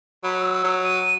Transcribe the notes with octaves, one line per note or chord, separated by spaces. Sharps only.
F#3 B5
E6
F#3
D#7